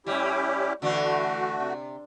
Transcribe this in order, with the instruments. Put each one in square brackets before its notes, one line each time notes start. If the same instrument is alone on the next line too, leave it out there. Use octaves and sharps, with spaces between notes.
[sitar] A2 G3 [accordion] C#4 E4 G4
[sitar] D3 E3 D4 [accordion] A3 F#4
[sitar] C3